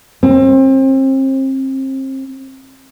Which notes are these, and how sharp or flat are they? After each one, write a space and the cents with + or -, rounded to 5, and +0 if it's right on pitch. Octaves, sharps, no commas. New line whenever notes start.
C4 +35